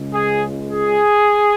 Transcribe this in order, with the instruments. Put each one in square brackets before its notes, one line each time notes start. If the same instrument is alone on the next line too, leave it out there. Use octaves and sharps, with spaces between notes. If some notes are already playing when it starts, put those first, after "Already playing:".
Already playing: [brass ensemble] C#2 C#3 G#3
G#4
G#4